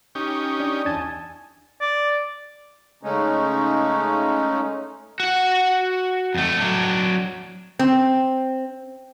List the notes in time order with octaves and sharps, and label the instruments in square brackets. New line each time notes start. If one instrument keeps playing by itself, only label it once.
[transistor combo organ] C#4 D#4 G4
[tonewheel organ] D4
[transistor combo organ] E2 D#5 [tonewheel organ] G#5 A5
[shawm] D5
[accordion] C#3 G#3 A3 C#4 D#4
[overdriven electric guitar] F#4 F#5
F2 A3
F#3 D4
[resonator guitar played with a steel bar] C4